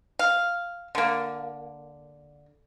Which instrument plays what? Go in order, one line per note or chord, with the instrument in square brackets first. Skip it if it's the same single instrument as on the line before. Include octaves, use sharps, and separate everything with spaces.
[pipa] F5
D3 A#3